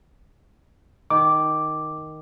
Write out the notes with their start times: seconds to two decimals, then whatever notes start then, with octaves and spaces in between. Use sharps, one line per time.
1.10 D#3 D6